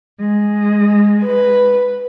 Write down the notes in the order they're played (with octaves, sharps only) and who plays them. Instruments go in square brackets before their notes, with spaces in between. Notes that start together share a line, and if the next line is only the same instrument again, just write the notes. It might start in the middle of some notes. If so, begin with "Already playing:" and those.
[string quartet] G#3
[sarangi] B4